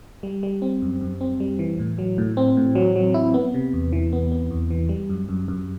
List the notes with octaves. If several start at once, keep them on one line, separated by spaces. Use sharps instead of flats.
G3
G3
C4
F#2
F#2
C4
G3
E3
A2
F#3
A2
C4
A2
F#3
F#3
E4
B3
C3
E2
E3
B3
B3
E2
E3
G3
F#2
F#2
F#2